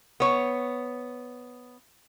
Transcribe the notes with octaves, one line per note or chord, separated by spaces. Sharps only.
B3 C#5